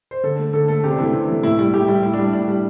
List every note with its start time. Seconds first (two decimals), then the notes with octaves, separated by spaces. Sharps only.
0.11 C5
0.23 D3 A4
0.39 A3
0.53 D3 A4
0.68 A3 A4
0.84 C3 G4
0.91 D4
0.98 E3 A3 E4
1.13 C3
1.28 E3 A3
1.43 A2 E4
1.58 G3 E4
1.73 A2 G4
1.88 G3 E4
2.03 A2 E4
2.14 G3 D4
2.33 A2 D4
2.48 G3